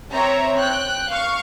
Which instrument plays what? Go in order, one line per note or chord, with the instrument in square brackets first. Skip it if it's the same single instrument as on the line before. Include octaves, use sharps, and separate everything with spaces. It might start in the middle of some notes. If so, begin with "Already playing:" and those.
[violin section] C4 C#5 E5 A#5
G5 F#6
F5 C#6